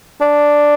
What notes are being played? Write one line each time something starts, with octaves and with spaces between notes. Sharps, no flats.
D4